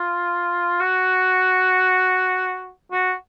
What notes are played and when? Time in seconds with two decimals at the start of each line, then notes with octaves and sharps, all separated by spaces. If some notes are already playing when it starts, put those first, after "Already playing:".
Already playing: F4
0.80 F#4
2.92 F#4